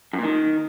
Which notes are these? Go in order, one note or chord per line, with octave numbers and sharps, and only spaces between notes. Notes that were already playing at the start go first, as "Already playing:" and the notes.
F#2
A#2
D#3